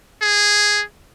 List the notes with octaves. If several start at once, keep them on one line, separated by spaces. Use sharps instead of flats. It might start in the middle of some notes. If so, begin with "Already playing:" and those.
G#4